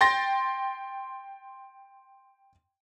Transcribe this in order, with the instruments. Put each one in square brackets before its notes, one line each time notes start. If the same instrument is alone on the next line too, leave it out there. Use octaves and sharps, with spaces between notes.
[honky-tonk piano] G5 C6 A6 A#6